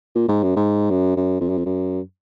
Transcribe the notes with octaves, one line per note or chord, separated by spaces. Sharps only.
A#2
G#2
F#2
G#2
F#2
F#2
F2
F#2
F2
F#2